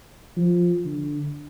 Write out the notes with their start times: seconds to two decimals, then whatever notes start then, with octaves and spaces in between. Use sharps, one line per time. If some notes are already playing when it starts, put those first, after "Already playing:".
0.37 F3
0.85 D3